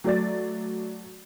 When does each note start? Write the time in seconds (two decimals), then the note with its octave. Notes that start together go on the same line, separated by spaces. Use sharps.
0.04 F#3 A3 D5 A6